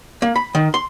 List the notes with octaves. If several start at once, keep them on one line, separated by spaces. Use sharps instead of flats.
A#3
B5
D#3
C6